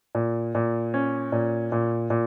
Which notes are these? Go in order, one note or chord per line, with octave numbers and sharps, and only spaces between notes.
A#2
A#2
C#4
A#2
A#2
A#2